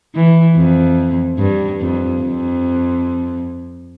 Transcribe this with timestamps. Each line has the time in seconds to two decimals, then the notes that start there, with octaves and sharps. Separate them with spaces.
0.15 E3
0.56 F2
1.38 G2
1.80 F2
2.22 F2